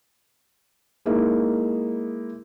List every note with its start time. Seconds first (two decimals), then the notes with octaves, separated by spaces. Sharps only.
1.06 G#3 A#3 D#4 E4